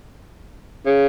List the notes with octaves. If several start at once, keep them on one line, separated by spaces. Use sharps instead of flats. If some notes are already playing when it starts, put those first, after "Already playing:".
C#3